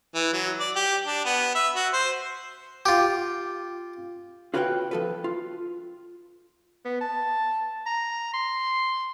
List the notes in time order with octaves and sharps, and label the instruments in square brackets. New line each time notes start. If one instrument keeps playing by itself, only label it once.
[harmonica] E3
F#3
D5
G4
D4
B3
E5
F#4
C5
[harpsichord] F4 G4
[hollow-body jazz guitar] F4 F#4 B4 C#5 F5 G5
F3 A4 B4
F4
[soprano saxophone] B3
A5
A#5
C6